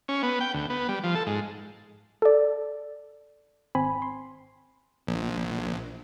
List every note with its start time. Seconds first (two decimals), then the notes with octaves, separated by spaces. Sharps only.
0.08 C#4
0.23 B3
0.40 G5
0.54 D2
0.70 B3
0.89 G3
1.04 F3
1.15 A4
1.27 G#2
2.22 A4 D5
3.75 G#1 C4 G#5 B5
4.02 C6
5.07 A#1